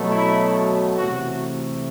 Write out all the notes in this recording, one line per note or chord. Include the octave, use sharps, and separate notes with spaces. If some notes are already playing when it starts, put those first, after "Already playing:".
Already playing: B2 F#3 A3
E4
C3 E3 A3 F#4